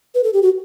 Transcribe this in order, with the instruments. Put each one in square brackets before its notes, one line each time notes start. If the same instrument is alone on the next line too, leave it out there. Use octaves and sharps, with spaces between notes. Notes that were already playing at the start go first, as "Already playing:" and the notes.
[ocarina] B4
A4
G4
F#4